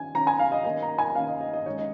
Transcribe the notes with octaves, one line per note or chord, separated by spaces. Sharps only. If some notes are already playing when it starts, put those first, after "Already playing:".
Already playing: D#3 C#4 G#5
D#3 C#4 A#5
G#5
F5
D#5
D#3 A#3 C#4 D#5
A#5
G#5
D#3 A#3 C#4 F5
D#5
D#5
D#5
D#3 G#3 C#4 C#5
D#5